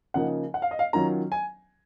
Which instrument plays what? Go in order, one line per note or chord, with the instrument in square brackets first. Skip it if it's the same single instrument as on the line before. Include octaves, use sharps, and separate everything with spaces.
[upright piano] C#3 F3 A#3 D#4 F#5
F#5
F5
D#5
F5
D#3 F#3 C#4 F4 A#5
G#5